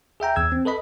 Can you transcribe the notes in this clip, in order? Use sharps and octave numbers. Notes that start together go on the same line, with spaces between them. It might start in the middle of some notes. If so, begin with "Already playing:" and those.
G#4 E5 G5 A#5
E2 E6 G#6
C4
A4 B4 D#5 B5